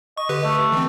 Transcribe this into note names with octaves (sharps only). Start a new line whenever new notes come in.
D#5 C#6
D3 G4 B4
A3
E3 C4